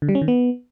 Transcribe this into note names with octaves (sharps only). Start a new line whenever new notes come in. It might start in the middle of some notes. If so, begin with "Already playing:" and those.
D3
G3
C#4
D#3
B3